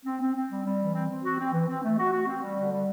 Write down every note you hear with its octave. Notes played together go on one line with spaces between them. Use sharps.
C4
C4
C4
G3
G3
E3
C4
C4
F#4
C4
E3
C4
A3
F#4
F#4
C4
G3
D3
G3